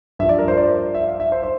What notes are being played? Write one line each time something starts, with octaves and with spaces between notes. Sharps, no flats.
G2 F3 E5
D5
A#4
C5
D5
E5
F5
E5
C5
C5